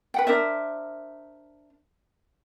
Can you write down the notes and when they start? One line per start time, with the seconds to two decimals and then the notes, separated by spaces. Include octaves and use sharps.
0.14 B4 F#5 G5
0.27 D4 A#4 C5 E5